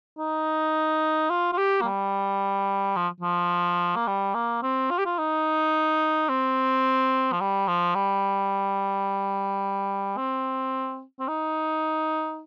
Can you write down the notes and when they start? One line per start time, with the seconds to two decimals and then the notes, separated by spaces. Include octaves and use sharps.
0.19 D#4
1.30 F4
1.53 F4
1.58 G4
1.82 A#3
1.85 G3
2.96 F3
3.20 F3
3.96 A#3
4.07 G3
4.34 A#3
4.62 C4
4.91 F4
4.98 G4
5.05 F4
5.19 D#4
6.29 C4
7.32 F3
7.41 G3
7.68 F3
7.95 G3
10.17 C4
11.20 C4
11.28 D#4